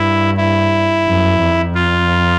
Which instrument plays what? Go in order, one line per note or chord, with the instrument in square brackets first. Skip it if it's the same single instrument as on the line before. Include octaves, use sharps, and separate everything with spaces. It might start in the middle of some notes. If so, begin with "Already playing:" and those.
Already playing: [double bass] G2 [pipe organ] E4
[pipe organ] E4
[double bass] F#2
F2
[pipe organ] F4